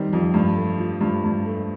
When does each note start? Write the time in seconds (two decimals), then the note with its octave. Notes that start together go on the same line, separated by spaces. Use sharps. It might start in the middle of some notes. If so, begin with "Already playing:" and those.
Already playing: D#3 G3 C4
0.13 F2
0.34 G2
0.56 A3
0.78 F3
1.01 G2
1.24 G2
1.46 A3